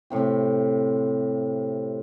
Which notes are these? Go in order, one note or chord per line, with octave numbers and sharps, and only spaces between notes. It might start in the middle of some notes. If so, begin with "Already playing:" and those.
A2 C3 G4